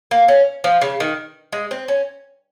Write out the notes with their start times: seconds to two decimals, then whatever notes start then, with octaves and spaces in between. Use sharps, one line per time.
0.11 A#3
0.28 C#4
0.64 F3
0.82 C#3
1.00 D#3
1.52 G#3
1.71 C4
1.88 C#4